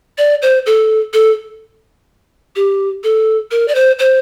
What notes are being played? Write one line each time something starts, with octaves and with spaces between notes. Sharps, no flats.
D5
C5
A4
A4
G4
A4
A#4
D5
C5
C5